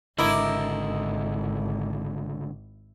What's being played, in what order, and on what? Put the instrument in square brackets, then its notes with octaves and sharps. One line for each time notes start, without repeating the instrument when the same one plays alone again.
[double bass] G#1 [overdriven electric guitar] C#2 D3 [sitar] E4 [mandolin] A#4 D#5 D6